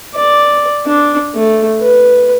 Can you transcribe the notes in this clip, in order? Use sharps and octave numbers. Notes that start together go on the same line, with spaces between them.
D5
D4
A3
B4